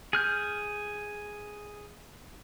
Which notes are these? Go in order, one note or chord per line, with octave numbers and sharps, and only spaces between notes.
G#4 F6 G6